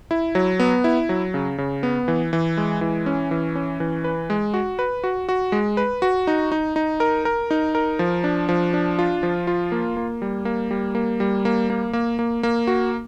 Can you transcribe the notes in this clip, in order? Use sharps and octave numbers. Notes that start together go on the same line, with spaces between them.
E4
F#3
B3
E4
F#3
C#3
C#3
B3
E3
E3
G#3
E3
C#4
E3
C#4
E3
B4
G#3
F#4
B4
F#4
F#4
G#3
B4
F#4
D#4
D#4
D#4
A#4
A#4
D#4
A#4
F3
D4
F3
D4
F4
F3
F4
A#3
A#3
G3
A#3
G3
A#3
G3
A#3
A#3
A#3
A#3
A#3
F#4